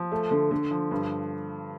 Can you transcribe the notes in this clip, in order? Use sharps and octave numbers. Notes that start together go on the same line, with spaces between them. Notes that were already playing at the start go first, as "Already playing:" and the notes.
Already playing: F3
A3
D3
D3
F3
G2